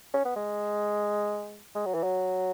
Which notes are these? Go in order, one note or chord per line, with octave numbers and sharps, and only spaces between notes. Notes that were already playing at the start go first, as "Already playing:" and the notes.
C#4
B3
G#3
G#3
F#3
E3
F#3